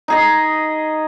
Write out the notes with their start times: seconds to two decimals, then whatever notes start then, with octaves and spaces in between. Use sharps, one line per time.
0.08 D#4 G#4 D#5